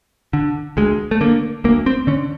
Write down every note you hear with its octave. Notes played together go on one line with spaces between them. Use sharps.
D3
D2 G#3
A3
D3 A#3
D2 A#3
C4
D3 C#4